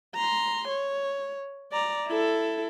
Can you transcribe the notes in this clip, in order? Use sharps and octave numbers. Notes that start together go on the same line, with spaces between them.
A#5 C6
C#5
D5 A#5
E4 A4